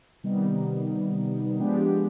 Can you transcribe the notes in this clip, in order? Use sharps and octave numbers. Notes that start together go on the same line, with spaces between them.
C3 D#3 G3 B3 D#4
F3 G#3 B3 D4 G4